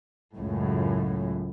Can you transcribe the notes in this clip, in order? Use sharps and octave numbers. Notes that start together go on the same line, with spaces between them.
C#2 F#2 A2